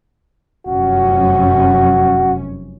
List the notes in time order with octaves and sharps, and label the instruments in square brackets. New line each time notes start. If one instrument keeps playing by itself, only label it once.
[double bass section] F1 F#2 C#4 [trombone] F#4